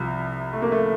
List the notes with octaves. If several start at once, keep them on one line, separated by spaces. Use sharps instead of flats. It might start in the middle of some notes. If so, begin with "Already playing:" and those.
Already playing: C2 C3 F3
A3
A#3
A3